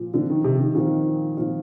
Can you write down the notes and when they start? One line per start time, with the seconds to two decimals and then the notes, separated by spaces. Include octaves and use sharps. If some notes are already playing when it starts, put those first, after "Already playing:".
Already playing: A#2 F3 F4
0.14 A#2 D3 F3 C4 F4
0.30 D#3
0.44 C3
0.59 D#3
0.75 A#2 D#3 F3 C4 F4
1.37 A#2 F3 C4 F4